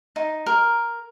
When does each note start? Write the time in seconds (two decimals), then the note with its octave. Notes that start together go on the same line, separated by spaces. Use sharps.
0.16 D#4
0.46 A#4